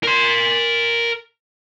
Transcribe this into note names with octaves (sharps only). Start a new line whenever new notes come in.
A#4 C6